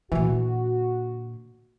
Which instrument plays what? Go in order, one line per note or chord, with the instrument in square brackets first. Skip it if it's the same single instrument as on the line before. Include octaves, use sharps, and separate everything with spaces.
[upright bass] A#2 D3 [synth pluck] E3 [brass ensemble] F#4